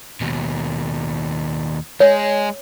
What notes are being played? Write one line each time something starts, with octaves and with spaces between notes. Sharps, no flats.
D#2 B2
G#3 G#4 C#5